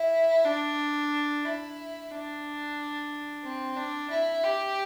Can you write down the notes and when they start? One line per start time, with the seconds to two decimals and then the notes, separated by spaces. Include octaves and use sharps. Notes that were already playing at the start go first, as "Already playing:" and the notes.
Already playing: E4
0.45 D4
1.45 E4
2.11 D4
3.44 C4
3.77 D4
4.11 E4
4.44 G4